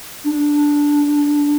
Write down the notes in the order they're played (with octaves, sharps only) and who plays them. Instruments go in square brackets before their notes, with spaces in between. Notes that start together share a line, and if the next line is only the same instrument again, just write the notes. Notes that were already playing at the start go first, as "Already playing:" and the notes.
[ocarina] D4